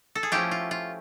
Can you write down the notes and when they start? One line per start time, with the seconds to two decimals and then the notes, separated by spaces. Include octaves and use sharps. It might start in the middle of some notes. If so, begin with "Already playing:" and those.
0.15 A4
0.23 G#4
0.32 F3 A3 C#4 E4 F4 G4
0.51 F4
0.71 F4